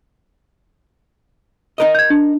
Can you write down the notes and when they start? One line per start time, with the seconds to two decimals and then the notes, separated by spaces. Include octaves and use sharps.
1.78 D#4 A#4 D#5
1.95 G6 G#6
2.10 D4